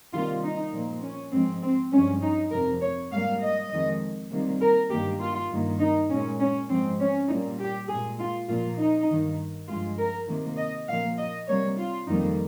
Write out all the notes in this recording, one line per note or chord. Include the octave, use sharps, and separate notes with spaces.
C3 D#3 G3 A#3 F4
D#4
A#2 F3 A#3
C#4
G#2 F3 G#3 C4
C4
G2 F3 G#3 C#4
D#4
F2 C3 F3 A#4
C#5
G#2 G3 A#3 F5
D#5
F2 D#3 G#3
C3 D#3 G3 A#3
A#4
G2 D#3 A#3 G4
F4
G2 D#3 A#3
D#4
A#2 G#3 C#4
C#4
G#2 F3 G#3 C4
C#4
A#2 G3 A#3 D#4
G4
G#3 G#4
A#2
F4
A#2 F3 A#3 F4
D#4
G2 D#3 A#3
G2 F3 G#3 F4
A#4
C3 D#3 A#3
D#5
A#2 F3 A#3 F5
D#5
C3 G3 A#3 C#5
F4
F2 D#3 G3 A#3 D#4